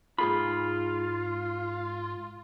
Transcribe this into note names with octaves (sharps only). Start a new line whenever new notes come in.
G#2 F4 G#4 B5